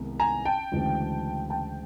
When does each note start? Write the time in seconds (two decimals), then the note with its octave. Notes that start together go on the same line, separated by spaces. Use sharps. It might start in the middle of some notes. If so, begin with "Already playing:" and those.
Already playing: C2 C3 D#3 G#3 B3
0.20 G#5 A#5
0.45 G5 A5
0.72 D2 C#3 E3 G#3
1.50 G5 A5